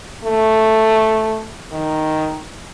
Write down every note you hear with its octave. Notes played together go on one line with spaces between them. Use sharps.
A3
D#3